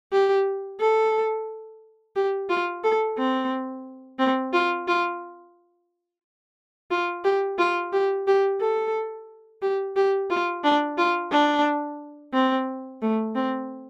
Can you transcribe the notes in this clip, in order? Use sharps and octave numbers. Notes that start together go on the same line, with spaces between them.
G4
A4
G4
F4
A4
C4
C4
F4
F4
F4
G4
F4
G4
G4
A4
G4
G4
F4
D4
F4
D4
C4
A3
C4